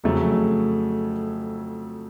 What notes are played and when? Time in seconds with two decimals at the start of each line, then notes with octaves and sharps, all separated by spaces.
0.04 F2 C#3 F#3 A3